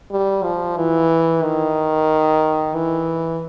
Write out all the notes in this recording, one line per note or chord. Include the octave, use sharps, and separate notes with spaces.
G3
F3
E3
D#3
E3